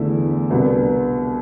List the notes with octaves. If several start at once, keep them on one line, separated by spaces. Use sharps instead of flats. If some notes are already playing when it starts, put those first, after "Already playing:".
Already playing: E2 D3 A3 E4
C2 B2 B3 D4